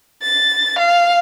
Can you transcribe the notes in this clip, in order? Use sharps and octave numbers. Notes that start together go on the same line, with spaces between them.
A6
F5